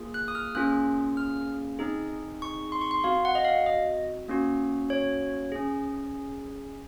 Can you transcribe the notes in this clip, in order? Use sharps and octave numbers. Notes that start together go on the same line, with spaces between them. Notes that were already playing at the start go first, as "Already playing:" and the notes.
Already playing: A#3 F4 G#4
F#6
D#6
F6
A#3 C#4 F4 G#4 F#6
F6
C4 D#4 G#4
C#6
C6
C#6
C6
C4 F#4 F5
F#5
D#5
F5
D#5
A#3 C#4 F#4
C#5
C#4 G#4